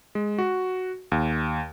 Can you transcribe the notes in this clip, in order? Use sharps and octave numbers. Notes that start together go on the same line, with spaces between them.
G#3
F#4
D#2